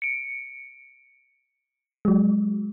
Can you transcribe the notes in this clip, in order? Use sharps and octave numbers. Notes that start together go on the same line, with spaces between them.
C#7 D7
F#3 G#3